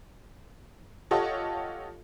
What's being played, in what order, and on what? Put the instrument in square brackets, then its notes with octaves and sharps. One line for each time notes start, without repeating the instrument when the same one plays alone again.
[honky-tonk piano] F4 G4 A4 C#5 D#5 F#5